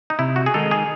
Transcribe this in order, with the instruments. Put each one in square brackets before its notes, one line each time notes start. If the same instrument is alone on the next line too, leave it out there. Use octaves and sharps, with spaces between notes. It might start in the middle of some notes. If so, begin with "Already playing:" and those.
[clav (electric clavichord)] D#4
[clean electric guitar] C3 [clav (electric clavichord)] E4
[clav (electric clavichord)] F#4
G#4
[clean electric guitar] D#3 G#3 D#4 [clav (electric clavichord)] A4
[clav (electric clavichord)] G#4